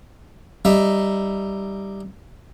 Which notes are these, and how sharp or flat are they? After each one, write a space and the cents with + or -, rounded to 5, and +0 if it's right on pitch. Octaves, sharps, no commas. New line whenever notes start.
G3 +0 D#4 -10 E5 +0